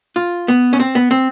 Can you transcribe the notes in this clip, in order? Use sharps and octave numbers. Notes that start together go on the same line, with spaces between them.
F4
B3
C#4
C4
B3
C4